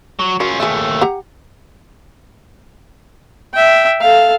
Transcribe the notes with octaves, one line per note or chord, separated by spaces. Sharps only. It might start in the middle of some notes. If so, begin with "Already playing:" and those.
F#3
F#3 C#4 F4 A#4
D#2 A3 G#4 E5
G4 F#5 A#5
E5 G5
A4 F5